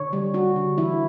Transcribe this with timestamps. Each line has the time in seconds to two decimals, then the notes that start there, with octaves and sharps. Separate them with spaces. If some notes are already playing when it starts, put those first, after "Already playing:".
Already playing: D3 C#5
0.13 G3
0.34 D4 F#4
0.56 D3
0.78 E3 E4